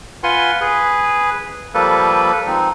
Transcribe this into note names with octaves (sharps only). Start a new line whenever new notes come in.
F4 B4 F#5 G#5 C6
G#4 B4
F3 G3 A#3 A4 B4
F3 G#3 C4 D#4